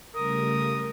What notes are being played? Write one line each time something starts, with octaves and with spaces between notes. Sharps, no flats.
C#3 G3 A3 A#4 D#6